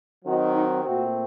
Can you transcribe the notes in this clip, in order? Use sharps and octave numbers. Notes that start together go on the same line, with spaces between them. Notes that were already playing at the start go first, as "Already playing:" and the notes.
D#3 F#3 C4 D#4 F#4
D#4
A#2 A3 C4 F#4